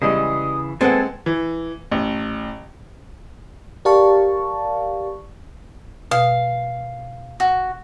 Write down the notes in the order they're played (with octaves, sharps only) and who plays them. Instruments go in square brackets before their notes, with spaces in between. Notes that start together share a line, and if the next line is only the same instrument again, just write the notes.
[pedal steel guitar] C#3 E3 [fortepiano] G3 G#3 D#5 [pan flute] D#6
[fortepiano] G#3 F#5 [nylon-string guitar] C4 [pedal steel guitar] A4 G#5 [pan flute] B4
[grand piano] E3
A1
[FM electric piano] G4 A#4 D5 F5 A5 C#6
[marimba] B2 [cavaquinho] F5
[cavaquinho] F#4